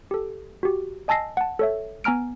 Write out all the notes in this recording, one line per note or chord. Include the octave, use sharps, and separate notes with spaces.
G4 A4
F#4 G4
D#5 G#5 A5 E6 A#6 C7
F#5 A5
A4 C#5 E5
B3 G#5 A#5 F6 D7